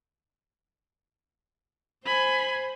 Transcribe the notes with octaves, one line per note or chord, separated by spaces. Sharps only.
C5 G#5 B5